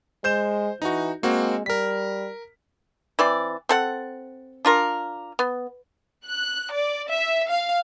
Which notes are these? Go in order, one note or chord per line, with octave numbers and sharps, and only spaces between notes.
G#3 C5 G6 E7
E3 D#4 F#4
G#3 A#3 C4 F#4
G3 A#4 B6
E3 C4 D5
C4 A4 F#5
D4 F4 A#4
B3
F#6
D5
E5
F5